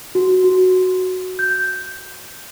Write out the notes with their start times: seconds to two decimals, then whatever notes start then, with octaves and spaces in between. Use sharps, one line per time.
0.15 F#4
0.44 F#4
1.39 G6